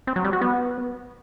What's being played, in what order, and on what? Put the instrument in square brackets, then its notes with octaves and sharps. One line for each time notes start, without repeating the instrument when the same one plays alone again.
[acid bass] C4
F#3
G3
F#4
B3